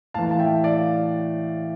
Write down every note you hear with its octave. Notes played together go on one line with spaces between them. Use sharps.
A2 E3 F5 A5
A5
E5 G5
D5 F5